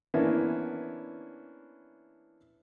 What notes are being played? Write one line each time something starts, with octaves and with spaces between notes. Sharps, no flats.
E3 A#3 B3 C#4 D4 E4